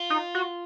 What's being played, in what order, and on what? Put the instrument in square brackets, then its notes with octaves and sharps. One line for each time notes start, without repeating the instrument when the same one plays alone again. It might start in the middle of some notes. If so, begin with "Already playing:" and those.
Already playing: [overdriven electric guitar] F4
[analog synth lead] D#4
F#4